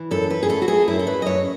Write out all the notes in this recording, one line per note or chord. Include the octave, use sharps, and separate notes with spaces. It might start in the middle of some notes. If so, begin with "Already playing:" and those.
Already playing: E3
F#2 A4
F#2 B4
G#4
A3 A4
F#4
A3 G#4
F#2 E4
A4
F#2 B4
D#5
F#2 C#5